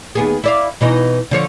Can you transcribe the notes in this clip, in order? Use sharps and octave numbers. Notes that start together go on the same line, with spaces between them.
D#2 B3 G#4
E4 D5 F5
B2 E3 D#4
D3 F3 C#5